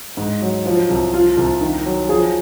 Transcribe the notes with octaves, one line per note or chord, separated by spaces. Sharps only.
G#2
F#3
F3
C2
F3 F4
C2
D#3
F#3
F3 G#4